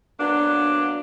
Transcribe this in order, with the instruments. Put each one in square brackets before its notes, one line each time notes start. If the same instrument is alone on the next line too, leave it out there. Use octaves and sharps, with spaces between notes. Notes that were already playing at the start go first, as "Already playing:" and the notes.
[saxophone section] F#3 A#3 B3 D4